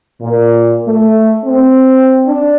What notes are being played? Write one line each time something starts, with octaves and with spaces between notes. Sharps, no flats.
A#2
A3
C4
D4